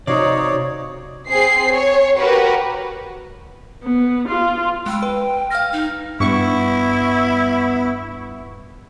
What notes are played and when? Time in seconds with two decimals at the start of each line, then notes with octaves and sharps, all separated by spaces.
0.07 C3 D#4 F#4 C#5 D5 F5
1.28 C4 G#4 C7
1.71 C#5
2.17 F#4 G4 A#4 B4
3.83 B3
4.28 F4
4.86 G#3 G5 B5 E6
5.02 B4
5.50 F5 F6 A#6
5.73 D#4
6.20 G2 B3 E4 C#6